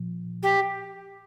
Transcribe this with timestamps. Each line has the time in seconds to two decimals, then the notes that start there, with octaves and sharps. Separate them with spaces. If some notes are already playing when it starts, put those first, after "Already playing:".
Already playing: A#2 F3
0.43 G4